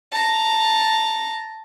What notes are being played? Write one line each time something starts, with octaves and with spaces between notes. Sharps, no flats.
A5 A#5